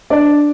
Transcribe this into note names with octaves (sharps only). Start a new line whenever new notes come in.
D4 D5